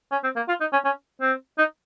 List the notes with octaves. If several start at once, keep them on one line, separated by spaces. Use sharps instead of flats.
C#4
C4
A#3
F4
D#4
C#4
C#4
C4
D#4